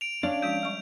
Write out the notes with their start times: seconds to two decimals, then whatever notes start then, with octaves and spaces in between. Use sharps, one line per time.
0.01 D7 F7
0.23 C#4 D4 C#5 D5 F5
0.42 F3 G#3 F#4 G6
0.63 G3 C#6